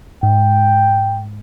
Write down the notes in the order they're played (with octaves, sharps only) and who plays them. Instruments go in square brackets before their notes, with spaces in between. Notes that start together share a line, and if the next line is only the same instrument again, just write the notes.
[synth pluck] G#2 [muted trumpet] G5